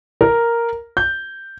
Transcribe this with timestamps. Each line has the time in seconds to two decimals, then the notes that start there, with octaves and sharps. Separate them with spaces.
0.21 A#4
0.97 G6